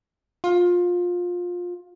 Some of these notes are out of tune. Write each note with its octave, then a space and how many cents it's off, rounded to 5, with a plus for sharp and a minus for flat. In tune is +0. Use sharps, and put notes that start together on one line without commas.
F4 +20